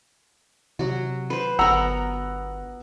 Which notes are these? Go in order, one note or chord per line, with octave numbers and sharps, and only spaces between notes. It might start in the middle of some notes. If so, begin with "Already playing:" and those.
C3 F#3 F#4
B4 C5
G1 B3 A#4 F#5 A#5 E6